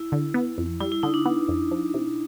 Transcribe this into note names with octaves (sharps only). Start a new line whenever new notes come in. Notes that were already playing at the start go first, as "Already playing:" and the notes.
Already playing: E4
D3
B3
F2
G3 E4
E4
D3 D#4
D4
B3
F2
F3
C3